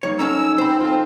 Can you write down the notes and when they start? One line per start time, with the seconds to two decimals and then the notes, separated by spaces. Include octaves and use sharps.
0.03 G3 A#3 D#4 C#5
0.19 F#3 C#4 A4 D#5 A#5 E6
0.58 C4 C5 B5
0.80 C4 F4 A4